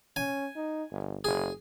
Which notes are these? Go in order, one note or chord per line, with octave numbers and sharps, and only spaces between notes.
C#4 G#5
D#4
G1
F#1 G#4